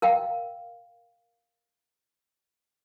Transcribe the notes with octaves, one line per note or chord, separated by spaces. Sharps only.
A#4 F5 G5